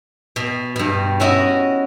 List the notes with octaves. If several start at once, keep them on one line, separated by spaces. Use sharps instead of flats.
B2
G2 B2
C#4 E4 F#4 D#5